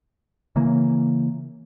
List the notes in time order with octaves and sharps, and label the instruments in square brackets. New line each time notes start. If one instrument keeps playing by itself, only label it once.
[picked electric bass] C#3 E3 A#3